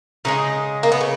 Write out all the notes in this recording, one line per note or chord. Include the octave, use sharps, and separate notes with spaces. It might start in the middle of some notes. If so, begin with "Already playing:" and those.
C#3 E3 G#3 D#4
A#3
B3
C#3